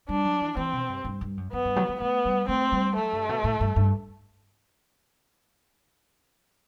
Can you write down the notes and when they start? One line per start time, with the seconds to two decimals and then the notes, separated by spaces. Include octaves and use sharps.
0.09 G3 D4
0.25 F#3
0.41 E3
0.57 E3 C4
0.73 B2
0.90 G2
1.05 G2
1.21 G2
1.37 F#2
1.53 F#2 B3
1.65 G2
1.76 F#3
1.89 G3
2.00 A3 B3
2.25 G3
2.48 A3 C4
2.72 G3
2.96 F#3 A3
3.13 G2
3.29 B2
3.44 A2
3.61 G2
3.76 G2